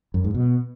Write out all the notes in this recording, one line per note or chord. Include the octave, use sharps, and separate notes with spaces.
F#2
G#2
B2